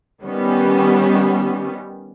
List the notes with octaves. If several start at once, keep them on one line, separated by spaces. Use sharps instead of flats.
D#3 G3 B3 C#4